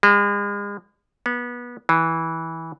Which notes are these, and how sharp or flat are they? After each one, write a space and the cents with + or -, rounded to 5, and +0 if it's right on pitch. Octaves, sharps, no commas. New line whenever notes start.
G#3 -40
B3 -25
E3 -15